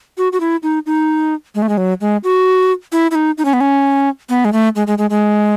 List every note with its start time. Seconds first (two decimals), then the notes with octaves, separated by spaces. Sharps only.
0.18 F#4
0.32 F#4
0.40 E4
0.63 D#4
0.86 D#4
1.55 G#3
1.62 A3
1.69 G#3
1.77 F#3
2.01 G#3
2.24 F#4
2.92 E4
3.11 E4
3.15 D#4
3.38 D#4
3.45 C#4
3.53 B3
3.60 C#4
4.29 B3
4.45 G#3
4.53 A3
4.76 G#3
4.87 G#3
4.98 G#3
5.10 G#3